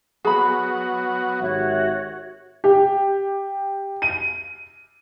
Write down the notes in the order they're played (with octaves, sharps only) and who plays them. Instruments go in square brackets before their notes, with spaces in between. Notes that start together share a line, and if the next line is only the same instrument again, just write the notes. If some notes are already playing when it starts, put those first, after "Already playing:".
[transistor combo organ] F#3 B3 F#4 [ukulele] G#4 B5
[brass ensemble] G#1 G4 E5 [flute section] F#4 C#5
[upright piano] G4
D#7